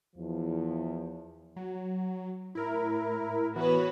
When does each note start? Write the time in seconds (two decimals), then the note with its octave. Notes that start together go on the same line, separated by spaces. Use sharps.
0.16 E2 F3
1.56 F#3
2.55 A2 E4 A#4
3.56 E3 B3 F#4 B4 C#5